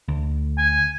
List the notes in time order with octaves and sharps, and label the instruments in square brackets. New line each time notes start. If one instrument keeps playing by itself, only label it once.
[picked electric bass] D2
[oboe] G#5